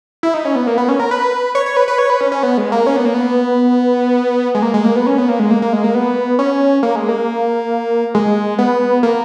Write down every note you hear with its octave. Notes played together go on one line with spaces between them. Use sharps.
E4
D#4
C#4
B3
A#3
B3
C#4
A#4
B4
C#5
C#5
B4
B4
C#5
B4
C#4
C#4
B3
G#3
A#3
C#4
B3
A#3
B3
G#3
A#3
G#3
A#3
B3
C#4
B3
A#3
G#3
A#3
A#3
G#3
A#3
B3
C#4
A#3
G#3
A#3
G#3
B3
A#3